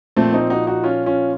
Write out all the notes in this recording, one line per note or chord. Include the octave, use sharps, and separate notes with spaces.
A#2 F3 A3 C4
C4 D#4
D#4 F#4
D#4 F#4
C#4 F4
C#4 F4